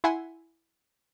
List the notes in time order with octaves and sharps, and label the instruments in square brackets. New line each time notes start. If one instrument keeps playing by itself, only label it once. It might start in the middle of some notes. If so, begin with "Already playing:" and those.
[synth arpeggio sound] E4 E5 F#5 G#5 C6